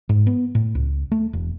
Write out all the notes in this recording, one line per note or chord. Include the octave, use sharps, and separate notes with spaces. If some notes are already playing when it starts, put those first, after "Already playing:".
G#2
B3
A2
C#2
A3
E1